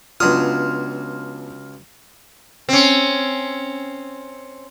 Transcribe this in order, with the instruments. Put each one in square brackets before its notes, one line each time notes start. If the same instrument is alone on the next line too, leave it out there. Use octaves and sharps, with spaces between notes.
[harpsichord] C#2 F#3 D#6 [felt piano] B3 D4 F4 [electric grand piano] F6
[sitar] C4 C#4